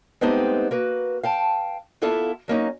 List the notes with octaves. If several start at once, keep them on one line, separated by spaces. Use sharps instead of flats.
G#3 A3 B3 C4 D#4 G4
A#3 F#4 B4
F5 G5 A5
A#3 B3 E4 F4 A4 E5
F#3 A#3 C#4 D#4